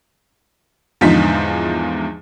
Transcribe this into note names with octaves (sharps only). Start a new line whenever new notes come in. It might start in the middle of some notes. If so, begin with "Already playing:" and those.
E2 G#2 D3 F3 D#4 B6